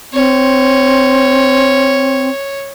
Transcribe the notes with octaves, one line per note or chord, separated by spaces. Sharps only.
C4 C#5